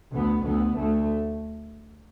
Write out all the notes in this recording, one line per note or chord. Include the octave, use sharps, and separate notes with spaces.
D2 B3
D2 B3
D2 A3